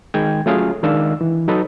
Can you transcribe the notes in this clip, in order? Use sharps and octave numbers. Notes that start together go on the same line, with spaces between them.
D#3 G#3 G5 G#6
F#3 A3 C#4 F4 G#4 F5
D#3 G#3 D4 F5 E6
E3
F#3 D#4 A4 B4 D#5